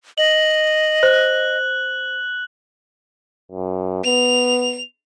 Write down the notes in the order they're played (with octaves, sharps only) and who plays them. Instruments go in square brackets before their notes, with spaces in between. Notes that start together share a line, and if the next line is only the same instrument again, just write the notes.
[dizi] D#5 [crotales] F#7
[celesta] C5 [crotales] F#6
[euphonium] F#2
[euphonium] B3 [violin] F7